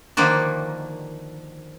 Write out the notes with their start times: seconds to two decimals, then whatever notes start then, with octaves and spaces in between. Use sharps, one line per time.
0.17 D3 D#3 F3 A#3 F#4 D5